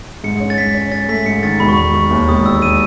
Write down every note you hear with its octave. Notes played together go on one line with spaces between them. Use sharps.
G#2 C#7
C#4
A6
G#2 B6
C#4
C#4 A6
A3 B6
G#2 C#7
D#3 A6
E1 B5
C#6
E1 B5
D#3 C#6
D#2
E1 D#6
E1 E6
D#7